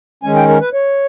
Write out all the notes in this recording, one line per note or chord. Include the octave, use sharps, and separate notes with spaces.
D#3 G#3 C#4 G#5
G5
A#4
B4
C#5